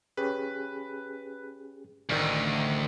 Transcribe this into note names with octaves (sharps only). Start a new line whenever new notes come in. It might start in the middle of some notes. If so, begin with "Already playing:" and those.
C#4 G4 G#4 B4
A1 D2 D#3